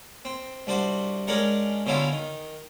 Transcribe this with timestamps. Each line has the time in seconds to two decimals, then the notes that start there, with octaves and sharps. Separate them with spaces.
0.25 C4
0.67 C2 D4 F#4 C5
1.27 G#3 C#4 D4 G#4 A#4 F#5
1.86 B2 D3 F#3 C#4 E4 F4
2.12 D#3